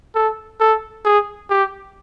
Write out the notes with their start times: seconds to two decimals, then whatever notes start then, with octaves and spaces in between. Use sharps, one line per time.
0.15 A4
0.60 A4
1.05 G#4
1.50 G4